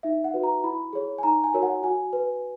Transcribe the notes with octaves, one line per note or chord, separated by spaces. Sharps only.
D#4 E5
F#5
F#4 B4
A#5
E4 B5
G#4 C#5
G#5
D#4 A#5
G#5
F#4 A#4 C#5
F#5
F#4 G#5
B4